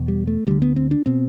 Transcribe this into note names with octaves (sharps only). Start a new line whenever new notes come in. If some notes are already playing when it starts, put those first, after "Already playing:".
Already playing: E2 B2
G3
A3
D2 D3 G3
B3
C4
D4
B2 C4